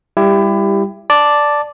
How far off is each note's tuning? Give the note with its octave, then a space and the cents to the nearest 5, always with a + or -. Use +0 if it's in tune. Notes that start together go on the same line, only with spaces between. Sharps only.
G3 +20 E4 +25 G4 +10
D5 +0 A5 +0